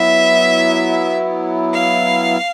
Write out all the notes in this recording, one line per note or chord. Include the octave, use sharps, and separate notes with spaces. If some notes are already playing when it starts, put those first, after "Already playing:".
Already playing: F#3 B3 E4 E5
F5